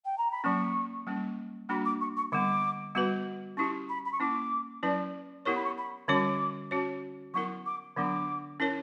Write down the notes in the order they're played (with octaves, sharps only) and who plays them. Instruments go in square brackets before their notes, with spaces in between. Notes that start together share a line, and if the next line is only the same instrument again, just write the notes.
[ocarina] G5
A#5
B5
[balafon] F#3 A#3 C#4 [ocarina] C#6
[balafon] G3 A#3 C#4
[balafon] G3 A#3 D4 F#4 [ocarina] B5
[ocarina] D6
C#6
C#6
[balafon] D3 G3 B3 [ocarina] D6
[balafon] G3 B3 F#4 B4
[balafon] C#4 E4 G4 [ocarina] C#6
[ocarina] B5
B5
C#6
[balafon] A#3 C#4 E4 [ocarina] D6
[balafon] F#3 C#4 E4 B4 D5
[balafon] B3 E4 G4 A#4 C#5 [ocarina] C#6
[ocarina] B5
C#6
B5
[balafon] D3 G3 C#4 F#4 C#5 [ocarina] D6
[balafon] C#4 F#4 C#5
[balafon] F#3 B3 E4 A#4 [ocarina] C#6
[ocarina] D6
[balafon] D3 F#3 B3 D4 [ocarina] D6
[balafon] C#4 E4 A#4 C#5